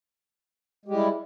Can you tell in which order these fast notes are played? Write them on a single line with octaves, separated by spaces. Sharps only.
G#3 G4 G3 E4